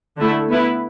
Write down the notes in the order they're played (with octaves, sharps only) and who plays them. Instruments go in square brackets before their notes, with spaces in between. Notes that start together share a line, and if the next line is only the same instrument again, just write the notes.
[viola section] D3 A3 E4
B3 E4 B4